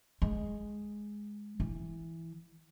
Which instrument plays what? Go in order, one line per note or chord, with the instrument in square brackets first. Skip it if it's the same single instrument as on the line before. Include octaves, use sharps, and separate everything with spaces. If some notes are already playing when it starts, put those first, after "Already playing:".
[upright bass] G#3
E3